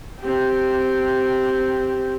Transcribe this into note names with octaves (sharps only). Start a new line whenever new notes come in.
C4 G4